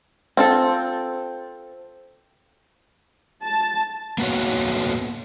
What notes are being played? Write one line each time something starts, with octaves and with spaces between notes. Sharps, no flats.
C4 F4 A4
A5
A#3 B3 F#4 C#5